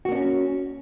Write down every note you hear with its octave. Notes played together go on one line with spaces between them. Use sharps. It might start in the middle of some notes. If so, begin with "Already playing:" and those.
A#3 C#4 D4 F#4